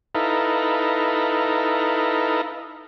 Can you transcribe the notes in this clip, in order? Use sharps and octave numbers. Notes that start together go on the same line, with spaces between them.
D#4 E4 A4 B4 F5 A#5